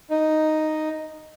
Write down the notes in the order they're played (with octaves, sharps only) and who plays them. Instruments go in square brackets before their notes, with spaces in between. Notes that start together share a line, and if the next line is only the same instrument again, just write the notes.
[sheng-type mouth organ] D#4